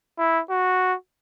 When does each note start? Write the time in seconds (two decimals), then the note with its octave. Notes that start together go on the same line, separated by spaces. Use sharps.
0.18 E4
0.50 F#4